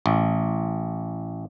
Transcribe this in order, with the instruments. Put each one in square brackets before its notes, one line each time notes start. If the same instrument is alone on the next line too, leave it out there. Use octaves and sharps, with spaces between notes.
[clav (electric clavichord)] A1